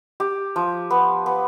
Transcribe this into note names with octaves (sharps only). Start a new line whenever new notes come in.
G4
F3
B3
B3